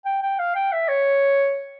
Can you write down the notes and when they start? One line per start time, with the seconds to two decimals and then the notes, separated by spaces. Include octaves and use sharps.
0.05 G5
0.23 G5
0.39 F5
0.55 G5
0.72 E5
0.88 C#5